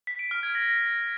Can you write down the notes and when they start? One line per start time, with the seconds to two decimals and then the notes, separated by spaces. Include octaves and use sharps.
0.07 B6
0.19 D7
0.31 F6
0.43 G#6
0.55 A#6